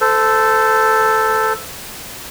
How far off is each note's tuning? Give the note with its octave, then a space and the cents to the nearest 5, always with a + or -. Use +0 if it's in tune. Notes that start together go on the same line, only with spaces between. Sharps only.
A4 +0 C5 -25